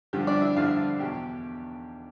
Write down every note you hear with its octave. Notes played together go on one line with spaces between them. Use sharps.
G2 D3 F3 G3 G4
D4 D5
E4 E5
G2 D3 F3 F4 F5
E2 B2 G4 G5